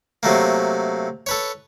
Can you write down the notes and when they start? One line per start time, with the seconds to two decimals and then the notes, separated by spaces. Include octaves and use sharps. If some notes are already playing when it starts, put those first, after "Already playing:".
0.23 C3 F#3 A3 A#3
1.26 A4 B4 C#5